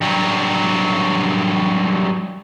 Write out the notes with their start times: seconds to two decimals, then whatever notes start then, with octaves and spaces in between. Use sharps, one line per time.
0.01 G2 F#3